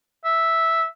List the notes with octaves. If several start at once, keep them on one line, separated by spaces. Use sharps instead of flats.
E5